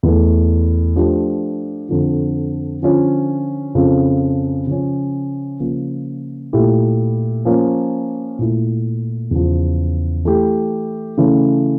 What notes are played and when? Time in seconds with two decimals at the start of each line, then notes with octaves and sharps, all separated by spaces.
0.03 E2 E3 A3
0.96 F3 A3 D4 G4
1.89 F2 D3 F3
2.82 D3 F3 C#4 F4
3.75 F2 C#3 F3
4.67 C#3 F3 C#4
5.60 C#3 F3 A#3
6.53 A#2 A3 E4 G4
7.45 F3 A#3 C#4
8.39 A#2 A3 E4
9.31 E2 C#3 F3
10.25 E3 A3 E4 G4
11.17 C#3 E3 A3 C#4